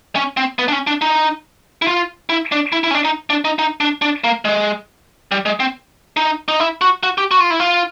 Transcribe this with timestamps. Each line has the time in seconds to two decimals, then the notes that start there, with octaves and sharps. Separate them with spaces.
0.16 C#4
0.37 C4
0.59 B3
0.68 D4
0.72 C#4
0.87 D4
1.02 D#4
1.82 E4
1.87 F4
2.29 E4
2.52 D4
2.72 E4
2.84 E4
2.91 C#4
2.94 D4
3.05 D#4
3.30 D4
3.45 D#4
3.59 D#4
3.81 D4
4.02 D4
4.24 A#3
4.45 G#3
5.32 G3
5.46 G#3
5.60 C4
6.17 D#4
6.48 D#4
6.60 E4
6.81 F#4
7.03 F#4
7.18 G4
7.31 F#4
7.40 F4
7.50 E4
7.60 F4